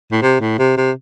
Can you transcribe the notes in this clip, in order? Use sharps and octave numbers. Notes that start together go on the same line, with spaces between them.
A2
C3
A2
C3
C3